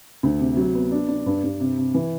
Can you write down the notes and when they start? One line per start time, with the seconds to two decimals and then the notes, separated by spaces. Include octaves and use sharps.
0.23 D2
0.40 C3
0.57 F#3
0.74 B3
0.92 D4
1.09 D4
1.26 G2
1.44 G2
1.60 C3
1.78 C3
1.94 E3